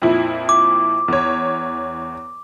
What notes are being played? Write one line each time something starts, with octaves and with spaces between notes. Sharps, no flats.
F2 A#2 E4
D6
E2 C#5